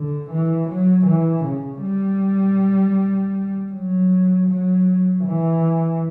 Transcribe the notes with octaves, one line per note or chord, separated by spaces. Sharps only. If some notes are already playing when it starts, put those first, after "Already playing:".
Already playing: D3
E3
F#3
E3
C#3
G3
F#3
F#3
E3